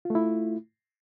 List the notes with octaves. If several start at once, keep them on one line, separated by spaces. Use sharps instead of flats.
A3 E4 F4